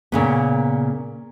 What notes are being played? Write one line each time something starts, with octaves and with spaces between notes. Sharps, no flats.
A#2 C#3 B3